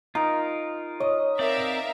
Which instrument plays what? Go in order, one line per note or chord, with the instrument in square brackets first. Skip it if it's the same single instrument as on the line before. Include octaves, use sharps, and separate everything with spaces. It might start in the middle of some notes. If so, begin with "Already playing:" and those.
[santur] D#4 [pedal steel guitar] F4 A#4
[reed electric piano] C#5 [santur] D#5
[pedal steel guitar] C4 D5 [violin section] A#4 E5 F5